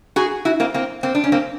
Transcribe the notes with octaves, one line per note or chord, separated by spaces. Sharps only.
F#4 G#4
E4 F#4
A#3 C4
A#3 C4
A#3 C4
D4
C#4
A#3 C4